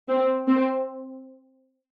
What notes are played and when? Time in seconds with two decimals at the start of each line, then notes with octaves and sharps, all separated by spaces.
0.09 C4
0.48 C4